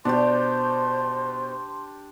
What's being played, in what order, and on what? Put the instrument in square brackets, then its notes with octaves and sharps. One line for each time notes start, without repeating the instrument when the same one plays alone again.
[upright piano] B2 [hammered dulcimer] D4 G4 [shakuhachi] C5 [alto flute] C6